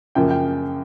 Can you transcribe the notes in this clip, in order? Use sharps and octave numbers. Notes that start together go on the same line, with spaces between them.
F#2 C#3 F3 A#3 G5
G5